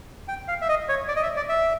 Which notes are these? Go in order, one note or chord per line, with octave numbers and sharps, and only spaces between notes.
G5
F5
E5
D#5
C#5
D5
D#5
E5
D5
E5